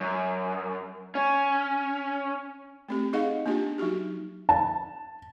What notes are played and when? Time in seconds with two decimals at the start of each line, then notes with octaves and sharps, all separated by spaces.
0.01 F#2
1.15 C#4
2.89 A3 C4 G4
3.13 D#4 G#4 D#5 F5 F#5
3.46 A#3 B3 D4 F4 G4
3.78 F#3 D#4 F#4 G4
4.49 A5